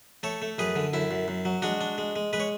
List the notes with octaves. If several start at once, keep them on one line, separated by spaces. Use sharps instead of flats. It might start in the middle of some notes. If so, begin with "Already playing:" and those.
A3 A4 C#5
A3
F#2 G#4 B4
D3
F#2 E4
F#2
F#2
F#3
G#3 D4 F#4
D4
G#3
G#3
G#3 B4
C#5